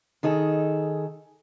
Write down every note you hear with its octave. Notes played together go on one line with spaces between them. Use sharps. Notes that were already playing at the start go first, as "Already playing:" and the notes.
D#3 D#4 G#4 A4